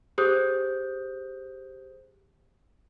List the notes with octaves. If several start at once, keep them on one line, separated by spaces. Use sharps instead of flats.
G4 G#4 C5 D#6 F#6 G6